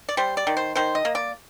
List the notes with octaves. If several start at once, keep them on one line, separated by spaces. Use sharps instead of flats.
D5
G3 C5
D5
D#3
C5
D#3 C5
D#5
A#3
D5